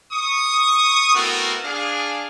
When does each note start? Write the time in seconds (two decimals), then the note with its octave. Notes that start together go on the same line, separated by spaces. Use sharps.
0.13 C#6 D#6
1.15 A3 B3 C4 E4 F#4 A#4
1.64 D4 G#4 F5